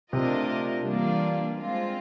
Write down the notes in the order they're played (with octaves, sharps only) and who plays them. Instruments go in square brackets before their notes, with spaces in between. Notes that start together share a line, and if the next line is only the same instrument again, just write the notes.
[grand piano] C3 [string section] A3 D4 F4 A#4 D#5
[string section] E3 G3 A#3 D4 F4
G#3 C4 F4